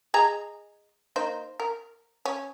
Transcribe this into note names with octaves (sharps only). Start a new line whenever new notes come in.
G#4 D#5 A#5
A#3 D#4 C5
A#4
C#4